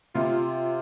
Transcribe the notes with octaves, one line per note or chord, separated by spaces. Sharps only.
C3 F4